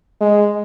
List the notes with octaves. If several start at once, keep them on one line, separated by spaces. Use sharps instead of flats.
G#3